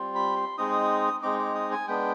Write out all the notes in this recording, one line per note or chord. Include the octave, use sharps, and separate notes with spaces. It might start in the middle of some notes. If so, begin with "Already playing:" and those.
Already playing: G3 C4 F4
B5
C6
G#3 C4 D#4 D#6
G#3 C4 D#4 D6
D6
D#6
G#5
G#3 B3 D4 G5